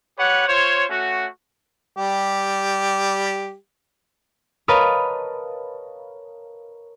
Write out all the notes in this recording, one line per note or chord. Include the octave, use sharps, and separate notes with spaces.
G4 B4 C#5 F#5
F4 C5 C#5
A3 C#4 F#4
G3 G4
A#4 B4 C#5 D#5 F5 A5